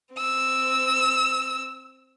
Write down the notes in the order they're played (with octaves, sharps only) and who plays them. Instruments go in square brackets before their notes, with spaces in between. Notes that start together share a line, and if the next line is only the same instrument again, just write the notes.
[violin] C4 E6